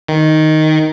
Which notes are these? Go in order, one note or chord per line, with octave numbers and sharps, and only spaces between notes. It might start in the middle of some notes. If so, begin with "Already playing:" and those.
D#3